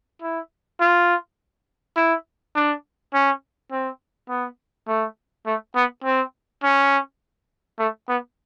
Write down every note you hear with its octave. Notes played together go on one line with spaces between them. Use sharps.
E4
F4
E4
D4
C#4
C4
B3
A3
A3
B3
C4
C#4
A3
B3